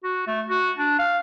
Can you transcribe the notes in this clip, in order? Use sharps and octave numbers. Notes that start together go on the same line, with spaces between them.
F#4
A3
F#4
D4
F5